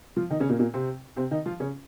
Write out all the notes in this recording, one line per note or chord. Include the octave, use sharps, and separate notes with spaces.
F3 F4
D#3 D#4
C#3 C#4
A#2 A#3
A#2 A#3
C3 C4
C3 C4
D#3 D#4
F3 F4
C#3 C#4